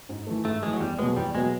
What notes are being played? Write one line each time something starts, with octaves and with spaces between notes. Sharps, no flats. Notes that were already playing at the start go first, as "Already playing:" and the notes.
G#2
E3 A3
G#2 A3
E3 G#3 A3
F#3
E2 G3
B2 F#3 G#3 B3
E2 G3
B2 F#3 G#3 B3